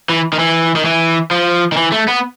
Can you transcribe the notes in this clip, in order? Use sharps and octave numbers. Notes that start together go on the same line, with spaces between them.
E3
D#3
E3
D#3
E3
F3
D#3
E3
A3
B3